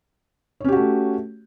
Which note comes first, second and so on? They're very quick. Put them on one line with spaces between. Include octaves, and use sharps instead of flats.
C#5 C#4 G4 F#4 A3